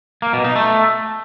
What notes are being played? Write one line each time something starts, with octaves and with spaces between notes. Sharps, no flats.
A#3
B2
D#4
A3